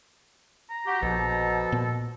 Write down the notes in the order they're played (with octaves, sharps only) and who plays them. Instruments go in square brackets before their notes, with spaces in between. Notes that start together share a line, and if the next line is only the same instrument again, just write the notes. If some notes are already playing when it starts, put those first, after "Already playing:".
[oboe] A#5
[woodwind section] F#4 G4
[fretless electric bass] A#1 [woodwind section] B2 F3 A4
[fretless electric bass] A#2 B3